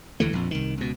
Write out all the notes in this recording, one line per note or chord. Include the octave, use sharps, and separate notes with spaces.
D2 E3 A3
A#1 F2
C2 D#3
C#2 B2